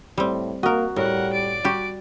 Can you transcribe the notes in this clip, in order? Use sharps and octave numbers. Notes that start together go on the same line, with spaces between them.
A2 G3 C4
A#3 F#4 A#4 D#5
A2 G3 A#4 F#5
D5 D7
G3 F#4 G4